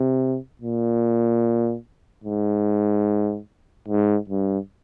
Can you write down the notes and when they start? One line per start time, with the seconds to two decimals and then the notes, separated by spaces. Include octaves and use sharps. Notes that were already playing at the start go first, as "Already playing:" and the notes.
Already playing: C3
0.61 A#2
2.24 G#2
3.88 G#2
4.29 G2